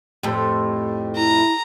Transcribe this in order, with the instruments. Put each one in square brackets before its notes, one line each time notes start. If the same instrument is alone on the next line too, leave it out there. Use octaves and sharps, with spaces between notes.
[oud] F2 A2 [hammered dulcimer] G4 A4 C5
[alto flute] E4 [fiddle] A#5